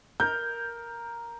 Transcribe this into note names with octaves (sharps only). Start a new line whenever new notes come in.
A#4 G6